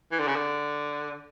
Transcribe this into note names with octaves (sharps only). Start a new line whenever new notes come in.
E3
D3
C#3
D3